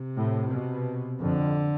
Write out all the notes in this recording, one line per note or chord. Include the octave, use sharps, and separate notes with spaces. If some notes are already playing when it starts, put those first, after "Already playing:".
Already playing: C3
A2
B2
F2 D3